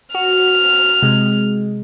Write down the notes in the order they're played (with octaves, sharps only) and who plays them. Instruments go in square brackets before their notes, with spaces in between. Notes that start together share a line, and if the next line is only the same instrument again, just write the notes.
[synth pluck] F#4 [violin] F6
[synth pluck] C3 G#3